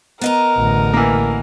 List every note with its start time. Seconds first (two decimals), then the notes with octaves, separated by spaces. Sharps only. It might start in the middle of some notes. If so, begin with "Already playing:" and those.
0.21 B3 A#4 D#5 A#5
0.58 A1 D3
0.93 E3 A#3